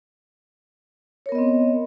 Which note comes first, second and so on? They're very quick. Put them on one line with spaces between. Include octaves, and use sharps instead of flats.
C#5 A#4 B3 D#5 C4